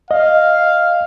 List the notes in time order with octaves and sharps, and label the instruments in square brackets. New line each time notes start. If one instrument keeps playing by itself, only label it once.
[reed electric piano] D#5 [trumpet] F5